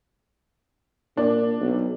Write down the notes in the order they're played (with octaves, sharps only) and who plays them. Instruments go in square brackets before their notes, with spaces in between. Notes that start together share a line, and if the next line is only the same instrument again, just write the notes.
[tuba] A#2 [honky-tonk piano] D4
[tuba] B1